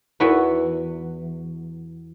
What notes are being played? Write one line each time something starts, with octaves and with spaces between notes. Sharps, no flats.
E2 E3 F#4 B4